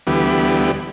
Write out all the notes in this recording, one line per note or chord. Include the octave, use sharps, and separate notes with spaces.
D2 E3 G3 B3